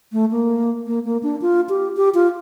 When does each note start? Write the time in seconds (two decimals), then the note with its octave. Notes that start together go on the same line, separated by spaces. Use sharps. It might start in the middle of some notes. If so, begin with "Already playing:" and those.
0.13 A3
0.31 A#3
0.87 A#3
1.05 A#3
1.23 D4
1.42 F4
1.69 G4
1.97 G4
2.14 F4